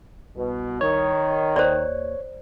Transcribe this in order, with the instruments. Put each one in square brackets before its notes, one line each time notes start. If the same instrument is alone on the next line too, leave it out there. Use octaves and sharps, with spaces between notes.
[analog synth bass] C2 [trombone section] B2
[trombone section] D#3 [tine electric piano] C#5
[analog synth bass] D#2 [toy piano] C5 D5